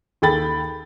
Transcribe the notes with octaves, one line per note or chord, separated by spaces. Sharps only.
D#2 G#4 A4 G5 B5 A6